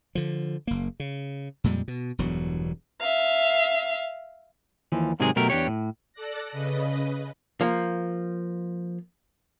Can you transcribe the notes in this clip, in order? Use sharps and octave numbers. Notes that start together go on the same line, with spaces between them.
D3 F3
F#1 A#3
C#3
F2 A#2 G3 G#3
B2
E1 E2 G2 F#3
E5 F5
D#2 E3 F3
G#2 C3 D#3 F#3 G#3 G#4
B2 F#3 A3 G4 A#4
E2 D4 G4 C#5
A2
A4 D5 F#6 A#6
C#3 B4 D#5
F3 A#3